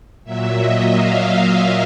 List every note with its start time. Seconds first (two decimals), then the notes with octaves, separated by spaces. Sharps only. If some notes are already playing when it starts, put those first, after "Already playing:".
0.24 A#2 F#3 E5
0.58 D#5
0.92 F5